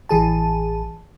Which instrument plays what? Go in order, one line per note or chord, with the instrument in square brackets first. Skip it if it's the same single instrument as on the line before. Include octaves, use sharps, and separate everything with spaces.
[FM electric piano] A1 E3 G#4 A5